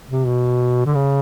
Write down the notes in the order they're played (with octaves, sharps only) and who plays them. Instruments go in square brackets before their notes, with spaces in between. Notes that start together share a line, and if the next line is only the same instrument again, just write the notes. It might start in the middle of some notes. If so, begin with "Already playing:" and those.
[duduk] C3
B2
D3
C#3